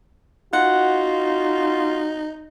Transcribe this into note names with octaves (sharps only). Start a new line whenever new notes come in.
D#4 F4 F#4 F#5